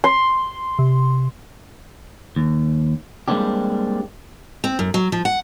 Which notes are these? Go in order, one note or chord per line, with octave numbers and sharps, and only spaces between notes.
C6
C3
D#2
G3 G#3 A#3 C4 D4 G4
C4
F#2
F#3
F3
F#5